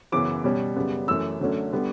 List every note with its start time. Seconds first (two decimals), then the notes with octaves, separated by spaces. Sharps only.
0.12 F#2 C#3 E3 B3 D6
0.44 B2 G3 C#4
0.76 F#2 C#3 G3 B3
1.08 F#2 E3 A3 E6
1.40 F#2 D3 F#3 A3 C#4
1.73 D3 G3 B3